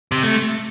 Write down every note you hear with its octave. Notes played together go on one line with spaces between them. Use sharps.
C3
A3